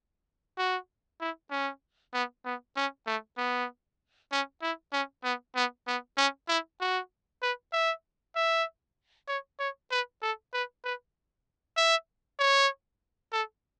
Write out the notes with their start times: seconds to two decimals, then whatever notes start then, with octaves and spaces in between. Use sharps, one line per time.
0.58 F#4
1.21 E4
1.51 C#4
2.14 B3
2.45 B3
2.76 C#4
3.07 A3
3.37 B3
4.32 C#4
4.62 E4
4.93 C#4
5.24 B3
5.56 B3
5.87 B3
6.17 C#4
6.48 E4
6.81 F#4
7.42 B4
7.73 E5
8.36 E5
9.28 C#5
9.59 C#5
9.91 B4
10.22 A4
10.53 B4
10.84 B4
11.77 E5
12.39 C#5
13.33 A4